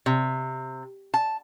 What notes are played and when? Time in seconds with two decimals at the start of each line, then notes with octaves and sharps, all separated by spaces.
0.06 C3
1.14 A5